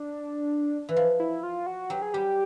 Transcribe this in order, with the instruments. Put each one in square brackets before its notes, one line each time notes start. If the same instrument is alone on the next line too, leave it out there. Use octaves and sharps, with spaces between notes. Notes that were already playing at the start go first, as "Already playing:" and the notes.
Already playing: [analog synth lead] D4
[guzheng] E3
F3
[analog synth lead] E4
F4
F#4
[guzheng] F#3 [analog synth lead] G4
[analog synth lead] G#4
[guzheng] G3 [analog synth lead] G4